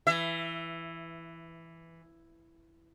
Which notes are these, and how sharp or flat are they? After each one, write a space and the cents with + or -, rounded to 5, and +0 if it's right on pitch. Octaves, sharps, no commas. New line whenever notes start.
E3 +5 E5 +25